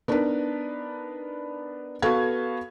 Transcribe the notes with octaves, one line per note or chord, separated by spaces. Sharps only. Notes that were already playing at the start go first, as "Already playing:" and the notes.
B3 D4 D#4 A#4 B4
B3 F#4 A4 B4 F5 G#6